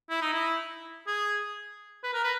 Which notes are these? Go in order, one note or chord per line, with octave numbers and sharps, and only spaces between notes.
E4
D#4
E4
G#4
B4
A#4
B4